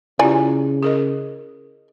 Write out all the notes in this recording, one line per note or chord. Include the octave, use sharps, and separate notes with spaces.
C#3 E4 F4 G4 D5 G#5
G#4 A#4 D#5